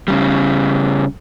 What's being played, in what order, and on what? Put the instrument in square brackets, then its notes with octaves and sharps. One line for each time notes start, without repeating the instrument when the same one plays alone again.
[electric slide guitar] C#3 G3